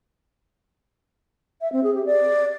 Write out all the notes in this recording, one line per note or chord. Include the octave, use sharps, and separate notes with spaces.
E5
C4
G#4
G4
D5